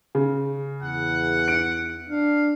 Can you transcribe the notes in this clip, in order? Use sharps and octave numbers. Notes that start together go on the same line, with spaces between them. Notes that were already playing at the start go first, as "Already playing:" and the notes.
C#3
E2 F#5
D7
D4 F5